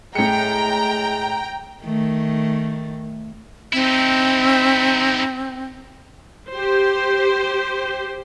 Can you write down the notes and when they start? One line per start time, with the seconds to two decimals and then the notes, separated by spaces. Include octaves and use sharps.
0.15 A2 G#3 G5 A#5 C#7
1.83 D#3 A3
3.73 C4 D#4 E4
6.50 G4 C5